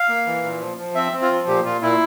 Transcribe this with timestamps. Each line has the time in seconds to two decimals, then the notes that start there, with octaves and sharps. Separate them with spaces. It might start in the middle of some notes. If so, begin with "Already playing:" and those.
Already playing: F5
0.08 A#3
0.27 E3
0.43 A#2
0.61 F3
0.77 F3
0.95 C4 E5
1.12 C4
1.22 F4
1.31 F3
1.47 A#2 G4
1.64 A#2 F4
1.81 A#2 E4